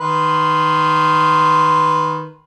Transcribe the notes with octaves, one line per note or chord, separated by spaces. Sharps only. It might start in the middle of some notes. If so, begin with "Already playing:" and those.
D#3 B4 C6